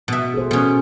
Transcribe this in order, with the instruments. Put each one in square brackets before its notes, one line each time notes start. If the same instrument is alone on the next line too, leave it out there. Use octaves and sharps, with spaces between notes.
[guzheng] B2 E5
[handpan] G#4 A4 C5
[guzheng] B2 C#4 [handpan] A4